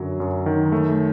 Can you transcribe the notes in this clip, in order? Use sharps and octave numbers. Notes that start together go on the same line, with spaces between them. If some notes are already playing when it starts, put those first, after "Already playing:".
Already playing: F#2 D3 F#3
F#2
D#3
A3